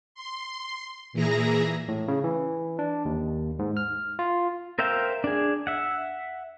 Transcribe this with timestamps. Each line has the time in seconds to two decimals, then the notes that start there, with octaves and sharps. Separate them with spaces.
0.15 C6
1.13 A#2 E3 E4 G#4 A#5 A#6
1.88 A2
2.08 C#3
2.24 E3
2.79 D4
3.05 D#2
3.59 G#2
3.77 F6
4.19 F4
4.79 A#4 C5 E5 F5 G5
5.24 D4 G#4
5.67 E5 F#5